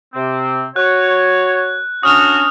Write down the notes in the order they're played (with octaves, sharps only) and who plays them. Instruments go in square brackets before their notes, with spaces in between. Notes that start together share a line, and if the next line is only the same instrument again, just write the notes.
[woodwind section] C3 C4
[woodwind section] F#4 C#5 [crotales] F#6
[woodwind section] C#4 D4 F#4 [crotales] D#6 F6 F7